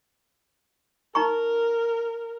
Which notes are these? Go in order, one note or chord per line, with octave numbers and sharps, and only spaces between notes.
D#4 A#4 A#5 C#6